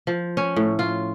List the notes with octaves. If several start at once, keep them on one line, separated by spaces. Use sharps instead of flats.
F3
C#4
A2
F4